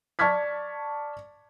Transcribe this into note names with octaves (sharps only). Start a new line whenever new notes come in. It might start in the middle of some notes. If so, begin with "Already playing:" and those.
D5 A5 C#6 F6 G#6 B6